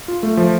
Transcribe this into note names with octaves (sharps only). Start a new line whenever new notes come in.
F4
A3
F3